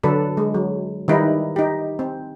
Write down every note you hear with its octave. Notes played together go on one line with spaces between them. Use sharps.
D3 F#3 D4 A4 B4
G#3
F#3
D#3 G3 D#4 E4 B4
D#4 G4
C4